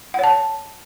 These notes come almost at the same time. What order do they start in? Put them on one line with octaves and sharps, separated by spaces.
F#5 C#5 A5